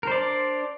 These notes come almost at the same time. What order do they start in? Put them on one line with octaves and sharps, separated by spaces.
A#4 C5 D5 D4